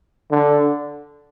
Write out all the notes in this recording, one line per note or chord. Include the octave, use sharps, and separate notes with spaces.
D3